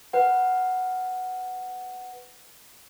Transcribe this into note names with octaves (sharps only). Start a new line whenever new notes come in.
B4 F#5